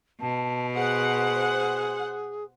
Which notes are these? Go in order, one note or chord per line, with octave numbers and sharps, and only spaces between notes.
B2 A5
G#4 C5 F#5